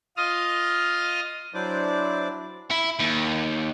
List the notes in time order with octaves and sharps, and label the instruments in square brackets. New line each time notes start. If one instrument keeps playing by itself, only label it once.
[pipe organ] F4 D#5 D#6 F6
[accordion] F#3 D4 E4 C5 D5 D6
[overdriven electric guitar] E4
D#2